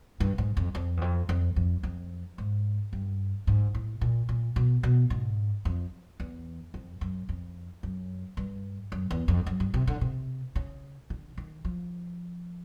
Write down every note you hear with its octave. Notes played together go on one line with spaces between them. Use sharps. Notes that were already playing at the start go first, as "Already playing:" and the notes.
G2
G#2
F2
F2
E2
F2
F2
F2
F2
G#2
G2
G#2
A2
A#2
A#2
B2
B2
G#2
F2
E2
F2
F#2
F2
F#2
G2
F#2
E2
F2
F#2
G2
C3
D3
C3
C#3
D3
D#3
F3